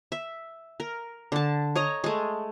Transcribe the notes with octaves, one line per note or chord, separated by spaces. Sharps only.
E5
A#4
D3 A5
C#5 D#5 A#5
G#3 A3